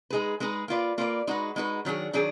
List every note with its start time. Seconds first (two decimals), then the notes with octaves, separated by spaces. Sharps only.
0.10 G#3 D#4 G#4 B4
0.40 G#3 D#4 G#4 B4
0.68 A#3 F4 B4 D5
0.98 A#3 F4 B4 D5
1.27 G#3 D#4 F#4 B4
1.56 G#3 D#4 F#4 B4
1.85 D#3 F#3 D4 G#4
2.13 D#3 F#3 D4 G#4